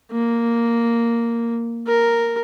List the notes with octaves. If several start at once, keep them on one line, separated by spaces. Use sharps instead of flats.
A#3
A#4